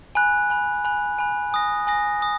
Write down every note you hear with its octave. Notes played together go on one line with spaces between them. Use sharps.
G#5 B5 F#6
G#5 B5 F#6
G#5 B5 F#6
G#5 B5 F#6
G#5 D#6 A#6
G#5 D#6 A#6
D#6 A#6